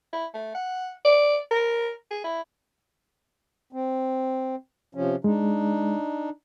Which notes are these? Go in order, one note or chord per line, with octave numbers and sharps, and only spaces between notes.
E4
A3
F#5
D5
A#4
G#4
E4
C4
C3 F3 C#4
G#3 D4 D#4